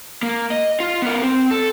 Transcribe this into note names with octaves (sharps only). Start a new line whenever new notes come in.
A#3
D#5
F4
B3 A#4
C4
A4